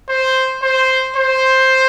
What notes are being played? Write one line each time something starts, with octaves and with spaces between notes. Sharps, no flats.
C5
C5
C5